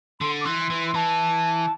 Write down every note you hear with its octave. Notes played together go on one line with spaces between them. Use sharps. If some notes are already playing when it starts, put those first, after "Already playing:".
D3 C6
D6
E3 C6
E3
C6
E3 A5